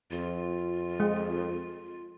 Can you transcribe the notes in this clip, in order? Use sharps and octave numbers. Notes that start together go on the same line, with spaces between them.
F2 F4
G#3